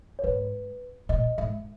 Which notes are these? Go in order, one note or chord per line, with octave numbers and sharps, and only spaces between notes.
C#5
G#2 B4
A#2 D#5
G#2 E5